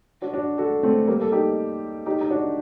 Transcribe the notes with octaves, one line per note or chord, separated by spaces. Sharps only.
D4 F#4
D4 F#4
F#4 A4
A3 C4
G3 A#3
A4
D#4 G4
D#4 G4
D#4
D4 F#4